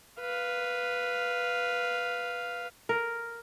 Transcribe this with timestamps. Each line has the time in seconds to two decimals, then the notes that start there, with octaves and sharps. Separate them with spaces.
0.21 B4 F5
2.89 A#4